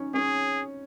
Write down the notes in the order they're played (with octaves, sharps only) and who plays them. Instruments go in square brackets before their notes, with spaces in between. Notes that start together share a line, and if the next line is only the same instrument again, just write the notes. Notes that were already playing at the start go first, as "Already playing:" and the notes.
Already playing: [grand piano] C#4 D#4
[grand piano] C#4 [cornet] G#4